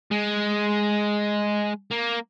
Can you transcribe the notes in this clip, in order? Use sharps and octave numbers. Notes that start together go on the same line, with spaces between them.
G#3
A#3